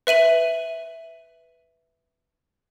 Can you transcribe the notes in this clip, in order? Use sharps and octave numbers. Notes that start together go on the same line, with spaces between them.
B4 E5 D#7 F#7